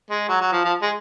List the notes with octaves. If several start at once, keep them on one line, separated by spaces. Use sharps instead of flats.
G#3
F#3
F#3
F3
F3
G#3